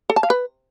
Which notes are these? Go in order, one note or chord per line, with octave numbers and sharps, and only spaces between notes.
A4
A5
F5
B4